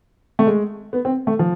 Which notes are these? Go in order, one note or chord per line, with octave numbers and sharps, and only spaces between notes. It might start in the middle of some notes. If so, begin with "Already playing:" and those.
A3
G#3
B3
C4
A3
F3